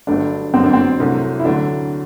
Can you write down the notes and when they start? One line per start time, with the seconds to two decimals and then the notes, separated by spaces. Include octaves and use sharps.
0.07 G1 G2 F#3 A3 D4
0.54 G1 F#2 F#3 C4
0.64 D4
0.73 C4
1.00 C2 C3 F#3 A3
1.39 E4
1.45 D2 D3 F#3 A3 D4